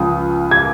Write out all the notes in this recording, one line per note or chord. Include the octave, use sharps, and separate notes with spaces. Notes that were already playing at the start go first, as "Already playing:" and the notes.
Already playing: C#2 C#3 F3 D#6
G#6